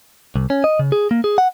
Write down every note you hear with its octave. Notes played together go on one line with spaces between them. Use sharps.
C2
C#4
D#5
C#3
G#4
A#3
G#4
F#5